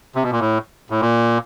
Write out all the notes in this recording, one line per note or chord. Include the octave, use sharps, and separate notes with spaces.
C3
B2
A#2
A2
A2
A#2